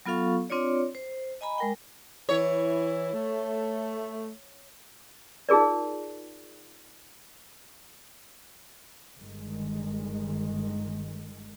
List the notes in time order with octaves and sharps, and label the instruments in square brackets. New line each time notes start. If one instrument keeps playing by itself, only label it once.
[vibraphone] F#3 B3 F4 A4 F5 C#6
C4 D4 F4 C#5 D5
C5
D#5 G#5 A#5 B5
G#3 A#4 G5
[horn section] E3 E4 [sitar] C#5
[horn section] A3
[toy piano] D#4 F4 G#4 A#4 D5
[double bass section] G1 D#3 G#3